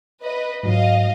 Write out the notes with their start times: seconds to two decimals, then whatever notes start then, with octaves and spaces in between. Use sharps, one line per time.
0.22 B4 D#5
0.63 G#2 F#3 D#5 F5